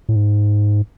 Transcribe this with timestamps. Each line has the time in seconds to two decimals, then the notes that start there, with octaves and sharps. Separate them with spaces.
0.09 A2
0.16 G#2